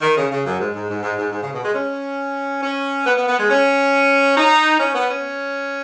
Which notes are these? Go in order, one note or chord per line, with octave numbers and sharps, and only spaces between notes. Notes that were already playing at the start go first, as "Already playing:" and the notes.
D#3
C#3
C#3
F#2
G#2
G#2
G#2
G#2
G#2
G#2
C#3
B2
G#3
C#4
C#4
B3
B3
B3
G#3
C#4
D#4
C#4
B3
C#4